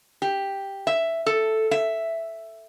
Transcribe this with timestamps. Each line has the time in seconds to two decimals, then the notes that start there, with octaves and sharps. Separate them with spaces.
0.22 G4
0.87 E5
1.26 A4
1.71 E5